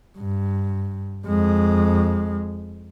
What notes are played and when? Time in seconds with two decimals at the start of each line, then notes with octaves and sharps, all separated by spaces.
0.19 G2
1.26 F2 G#3